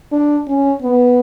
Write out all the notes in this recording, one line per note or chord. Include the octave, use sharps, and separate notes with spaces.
D4
C#4
B3